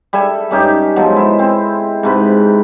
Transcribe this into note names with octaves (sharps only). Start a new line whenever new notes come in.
G3 A4 E5 G#5
G2 C#4 D#4 G4
B2 F3 F#3 G#3
E4
C4
G#2 C3 B4